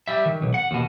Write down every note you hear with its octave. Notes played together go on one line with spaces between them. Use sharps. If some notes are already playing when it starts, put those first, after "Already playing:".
G3 E5
D#3
B1
F#5
D#2 B2